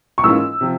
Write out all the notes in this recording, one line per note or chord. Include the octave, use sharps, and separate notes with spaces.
C#6
G#2 E3 A#3 C#4 F4 E6
C3 F3